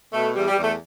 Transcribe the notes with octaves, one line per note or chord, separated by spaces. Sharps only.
B2 A3
E2 G3
G3
E2
A3